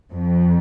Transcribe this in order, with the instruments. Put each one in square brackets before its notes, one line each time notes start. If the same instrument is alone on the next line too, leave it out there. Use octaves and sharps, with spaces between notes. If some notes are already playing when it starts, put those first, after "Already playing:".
[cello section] F2